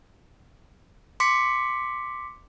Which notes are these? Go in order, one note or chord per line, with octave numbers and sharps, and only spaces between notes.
C6 D6 B6 C#7